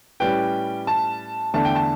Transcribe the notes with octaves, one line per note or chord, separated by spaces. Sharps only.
A2 G3 C#4 G4 B4 G5
A5
E2 D3 A3 D4 A5
G5
A5